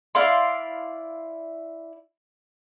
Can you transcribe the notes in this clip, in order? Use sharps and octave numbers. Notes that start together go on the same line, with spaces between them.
E4 D5 F5 C6